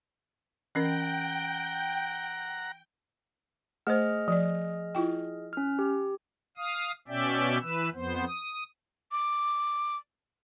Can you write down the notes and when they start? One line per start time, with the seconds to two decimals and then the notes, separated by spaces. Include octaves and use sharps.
0.75 E3 C#4 A#4 F#5 G5 A#5
3.87 A3 G#4 C5 D#5 F6
4.28 F3 D5
4.95 E4 F4 G5
5.53 C#4 F6
5.79 G4
6.57 F5 D#6
7.08 B2 C#4 D5 E5 G5
7.62 E3 B4 E6
7.94 F2 B3 C5
8.26 D#6
9.12 D6